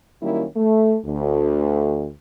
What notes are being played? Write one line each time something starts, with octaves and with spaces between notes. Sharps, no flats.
D#3 F#3 G3 A#3 C#4 E4
A3
D2